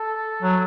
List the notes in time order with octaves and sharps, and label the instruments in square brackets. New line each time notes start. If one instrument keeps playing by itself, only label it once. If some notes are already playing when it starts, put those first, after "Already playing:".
Already playing: [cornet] A4
[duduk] F#3